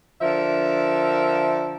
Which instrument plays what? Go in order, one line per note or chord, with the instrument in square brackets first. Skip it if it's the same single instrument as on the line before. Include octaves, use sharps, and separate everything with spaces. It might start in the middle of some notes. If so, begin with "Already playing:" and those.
[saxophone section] D3 F3 A#4 E5